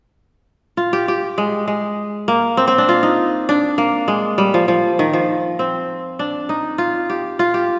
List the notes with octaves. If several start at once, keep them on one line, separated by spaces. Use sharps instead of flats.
F4
G4
G4
G#3
G#3
A#3
C4
C4
D4
F4
D#4
D4
A#3
G#3
G3
F3
F3
D#3
F3
C4
D4
D#4
F4
G4
F4
G4